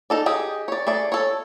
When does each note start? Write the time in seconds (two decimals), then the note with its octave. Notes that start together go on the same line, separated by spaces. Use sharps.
0.10 D#4 A4 D5
0.26 G4 G#4 D#5
0.68 C#5 D5
0.87 A3 G#4 D5
1.12 A4 C#5